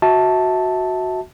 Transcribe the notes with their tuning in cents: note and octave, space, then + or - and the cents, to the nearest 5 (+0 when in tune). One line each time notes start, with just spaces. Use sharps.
F#4 +0 E5 -30 A5 +0